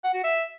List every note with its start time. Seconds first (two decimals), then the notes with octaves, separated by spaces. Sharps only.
0.04 F#5
0.14 F#4
0.24 E5